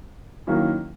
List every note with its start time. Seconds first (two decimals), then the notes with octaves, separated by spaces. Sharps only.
0.47 D#3 F#3 A#3 C#4 E4